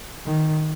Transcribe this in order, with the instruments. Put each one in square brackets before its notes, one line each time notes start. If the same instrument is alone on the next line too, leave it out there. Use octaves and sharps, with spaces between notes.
[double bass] D#3